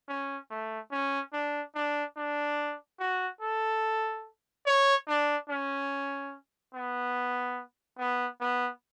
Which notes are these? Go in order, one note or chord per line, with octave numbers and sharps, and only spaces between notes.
C#4
A3
C#4
D4
D4
D4
F#4
A4
C#5
D4
C#4
B3
B3
B3